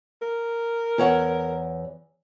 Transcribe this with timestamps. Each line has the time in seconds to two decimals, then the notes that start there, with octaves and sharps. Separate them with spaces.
0.22 A#4
0.98 E2 C#5 F#5